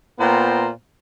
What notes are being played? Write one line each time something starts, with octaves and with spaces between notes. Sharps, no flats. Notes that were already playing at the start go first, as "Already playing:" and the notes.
A#2 B3 C5 G5 A#5